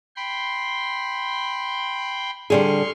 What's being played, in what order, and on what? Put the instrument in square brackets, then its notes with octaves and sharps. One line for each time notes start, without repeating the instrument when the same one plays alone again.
[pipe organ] G5 B5 C6
[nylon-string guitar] D3 G3 G#4 [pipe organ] C6 C#6 F6